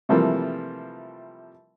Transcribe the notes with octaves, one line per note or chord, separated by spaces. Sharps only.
C3 E3 F3 G3 A3 A#3